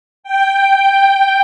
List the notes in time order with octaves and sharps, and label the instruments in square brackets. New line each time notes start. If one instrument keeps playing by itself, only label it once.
[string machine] G5